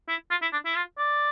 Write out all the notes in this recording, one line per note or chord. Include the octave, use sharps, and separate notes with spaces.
E4
F4
E4
D4
E4
F4
D5